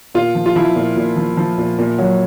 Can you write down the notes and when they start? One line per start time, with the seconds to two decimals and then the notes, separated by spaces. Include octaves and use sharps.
0.15 A#2 F4
0.35 F3
0.46 F4
0.55 F3 E4
0.76 A#2
0.96 A#2
1.17 F3
1.37 F3
1.58 A#2
1.79 A#2
1.98 F#3